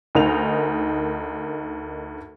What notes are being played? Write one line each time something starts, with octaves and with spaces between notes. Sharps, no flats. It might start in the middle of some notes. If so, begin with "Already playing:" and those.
D2 D#4 A#4 F7